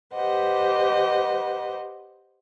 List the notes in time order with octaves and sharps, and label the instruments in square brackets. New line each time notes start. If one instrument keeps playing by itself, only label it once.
[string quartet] G4 B4 C5 D#5 F#5